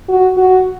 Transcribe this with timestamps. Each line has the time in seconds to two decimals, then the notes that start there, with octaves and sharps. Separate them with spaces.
0.09 F#4
0.37 F#4